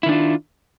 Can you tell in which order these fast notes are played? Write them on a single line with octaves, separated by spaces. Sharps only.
E4 D#3 D4 F4